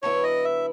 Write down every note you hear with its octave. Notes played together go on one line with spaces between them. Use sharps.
D3 F#3 B3 E4 C#5
D#5
E5